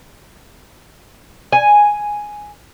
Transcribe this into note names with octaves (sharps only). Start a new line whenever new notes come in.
G#5